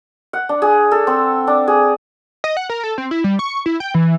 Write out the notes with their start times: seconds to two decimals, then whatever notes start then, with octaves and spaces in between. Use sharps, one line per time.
0.33 F#5
0.49 D4
0.62 G#4
0.91 A4
1.07 C4
1.47 D4
1.68 G#4
2.44 D#5
2.57 F#5
2.69 A#4
2.84 A4
2.98 C4
3.11 E4
3.24 G3
3.39 C#6
3.66 E4
3.80 G5
3.94 E3